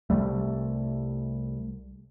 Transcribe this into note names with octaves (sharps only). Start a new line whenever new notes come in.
C2 G3 A3